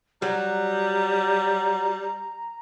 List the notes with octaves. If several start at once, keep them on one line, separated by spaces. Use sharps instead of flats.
F#3 G3 A#5